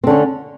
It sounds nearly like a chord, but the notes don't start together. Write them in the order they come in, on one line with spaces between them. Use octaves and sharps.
C4 D3 C#4